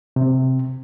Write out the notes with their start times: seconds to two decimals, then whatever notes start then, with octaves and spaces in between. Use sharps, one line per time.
0.16 C3